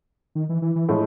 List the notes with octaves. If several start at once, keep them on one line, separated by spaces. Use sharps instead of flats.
D#3
E3
E3
E3
A2 F3 G#3